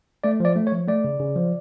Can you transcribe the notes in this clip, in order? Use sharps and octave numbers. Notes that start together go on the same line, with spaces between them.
A3 D5
F3 D5
A3
C#5
F3
A3 D5
C#3
C#3
F3